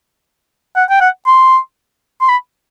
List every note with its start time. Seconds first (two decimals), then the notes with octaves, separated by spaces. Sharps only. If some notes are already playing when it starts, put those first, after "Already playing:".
0.76 F#5
0.90 G5
1.01 F#5
1.26 C6
2.21 C6
2.29 B5